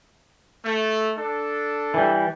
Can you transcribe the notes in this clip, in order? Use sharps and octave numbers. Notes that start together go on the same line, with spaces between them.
A3
D4 A4
E3 G3